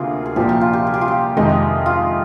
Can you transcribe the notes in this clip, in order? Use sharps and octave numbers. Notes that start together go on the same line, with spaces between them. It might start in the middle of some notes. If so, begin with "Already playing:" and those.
Already playing: D2 C3 A#3 F4 G#4
G#4
C2 A#2 F3 G4
G4
F4
G4
G#4
G4
F4
G4
F2 C3 D#3 G#3 D#4 G4
F4